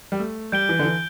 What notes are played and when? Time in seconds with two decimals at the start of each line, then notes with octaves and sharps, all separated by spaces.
0.12 G3
0.19 A3
0.52 G3 G6 D7 G7
0.69 E3
0.79 D3
0.85 E3